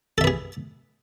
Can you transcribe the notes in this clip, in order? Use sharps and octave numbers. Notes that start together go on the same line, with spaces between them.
G#4 A4 B4 E5